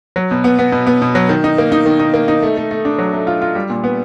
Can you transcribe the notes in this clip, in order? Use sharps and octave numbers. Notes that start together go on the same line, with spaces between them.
F#3
B2
B3
B3
B2
B3
B2
F#3
D#3
D#4
A#3
D#4
D#3
D#4
A#3
D#4
A3
A3
A3
D4
F#3
A3
F4
F4
G3
A#2
B3